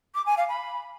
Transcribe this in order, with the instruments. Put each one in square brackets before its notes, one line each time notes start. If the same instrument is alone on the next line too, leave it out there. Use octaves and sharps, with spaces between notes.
[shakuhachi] D6
G#5
F5
B5